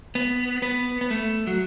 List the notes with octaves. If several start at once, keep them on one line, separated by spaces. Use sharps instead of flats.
B3
B3
B3
A3
F#3